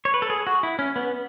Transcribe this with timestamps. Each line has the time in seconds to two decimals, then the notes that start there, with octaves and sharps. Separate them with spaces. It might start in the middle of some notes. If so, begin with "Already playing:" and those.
0.05 C#5
0.14 B4
0.22 A4
0.30 G#4
0.47 F#4
0.63 E4
0.79 C#4
0.96 B3